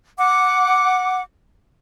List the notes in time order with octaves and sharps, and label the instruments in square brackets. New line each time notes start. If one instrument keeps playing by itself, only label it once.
[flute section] F#5 D6